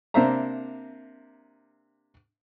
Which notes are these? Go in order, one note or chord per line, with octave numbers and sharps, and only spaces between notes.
C3 A#3 D4 C5 E5 A#5